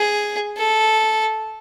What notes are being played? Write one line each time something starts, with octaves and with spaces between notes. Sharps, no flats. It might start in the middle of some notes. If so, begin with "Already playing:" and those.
Already playing: G#4
A4